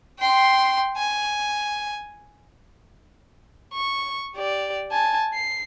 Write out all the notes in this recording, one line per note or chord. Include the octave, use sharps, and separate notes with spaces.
G5 C6
G#5
C#6
G4 D5
G#5 A5
C7